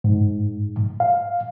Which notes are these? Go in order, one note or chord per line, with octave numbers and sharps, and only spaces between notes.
G#2
F5